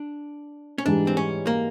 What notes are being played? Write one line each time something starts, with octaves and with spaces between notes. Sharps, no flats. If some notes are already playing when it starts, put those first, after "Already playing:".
Already playing: D4
C#4
G#2 E3 G3 D4
C4
C#4
A#3